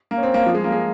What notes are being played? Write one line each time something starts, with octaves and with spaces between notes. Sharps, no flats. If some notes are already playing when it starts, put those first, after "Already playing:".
A#3
C#4
C4
A#3
F3
G#3
A#3
G#3